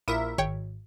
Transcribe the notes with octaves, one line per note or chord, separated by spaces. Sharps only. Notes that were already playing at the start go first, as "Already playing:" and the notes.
A#1 E4 A#4 E5 D#7
G#1 C#5 G5